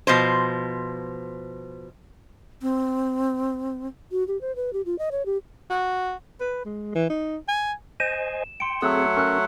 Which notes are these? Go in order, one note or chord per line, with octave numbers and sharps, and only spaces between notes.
B2 F3 C5
C4
F#4
G4
C5
B4
G4
F4
D#5
C#5
G4
F#4
B4
G#3
E3
D#4
G#5
C5 D#5 G#5 E7
G5 C6 C#7
F#3 A3 C4 G#4 A4 F#5 E6
C#4 A#4 C#6 E6 F#6